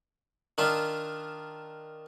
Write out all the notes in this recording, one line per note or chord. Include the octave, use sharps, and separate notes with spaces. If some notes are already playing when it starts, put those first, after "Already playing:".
D#3 D4 F4 E5